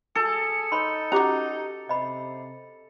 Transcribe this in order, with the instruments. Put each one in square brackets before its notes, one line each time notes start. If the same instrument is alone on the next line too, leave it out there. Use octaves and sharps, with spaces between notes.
[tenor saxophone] G#4 [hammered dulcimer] A4
[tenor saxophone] D#4 [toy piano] C#5 B5 C6
[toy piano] C#4 G4 D6 [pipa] F#4 A#5
[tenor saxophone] C3 [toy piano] D#5 B5